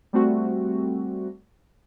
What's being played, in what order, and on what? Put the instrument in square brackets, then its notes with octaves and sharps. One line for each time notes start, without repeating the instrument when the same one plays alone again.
[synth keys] G3 A3 C4 F#4